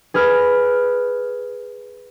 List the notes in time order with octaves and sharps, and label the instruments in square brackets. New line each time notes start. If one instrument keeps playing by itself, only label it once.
[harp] G#4 B4 F6